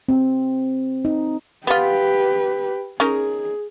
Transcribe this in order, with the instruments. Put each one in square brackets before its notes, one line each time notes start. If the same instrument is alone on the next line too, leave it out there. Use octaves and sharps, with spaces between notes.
[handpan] C4
D#4
[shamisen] B3 F4 [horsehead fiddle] G4 B4
[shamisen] C#4 D#4 A#4 [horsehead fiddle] G#4